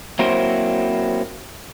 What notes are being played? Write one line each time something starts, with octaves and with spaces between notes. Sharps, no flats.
F#3 A#3 C4 E4 F#4 C5